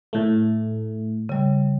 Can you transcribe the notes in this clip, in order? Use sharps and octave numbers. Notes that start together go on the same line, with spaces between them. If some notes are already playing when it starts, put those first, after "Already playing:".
A2 A3
C#3 G3